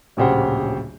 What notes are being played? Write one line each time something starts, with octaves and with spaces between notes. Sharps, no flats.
D1 A#1 C#3 G4 C5 F#5